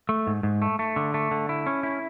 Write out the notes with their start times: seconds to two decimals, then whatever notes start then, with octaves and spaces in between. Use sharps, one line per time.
0.09 A3
0.27 G#2
0.43 G#2
0.62 A3
0.79 A3
0.96 D3
1.14 A3
1.31 D3
1.49 E4
1.67 C#4
1.83 E4